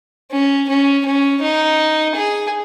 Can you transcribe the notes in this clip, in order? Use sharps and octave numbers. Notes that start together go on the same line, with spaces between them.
C#4
C#4
C#4
D#4
G#4